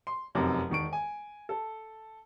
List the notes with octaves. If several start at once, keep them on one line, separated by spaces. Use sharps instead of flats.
C6
F1 F#2 C3 D#4
E1 D#3 C#6 D7
G#5
A4